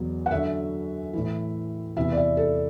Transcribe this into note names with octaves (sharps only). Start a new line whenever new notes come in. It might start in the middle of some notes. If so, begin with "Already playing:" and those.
Already playing: E2 B2 F#3
F#5
F#2 D3 F#3 E5
A2 E3
E2 C3 E3 E5
D5
E5
A4